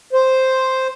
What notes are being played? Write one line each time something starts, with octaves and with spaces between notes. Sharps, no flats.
C5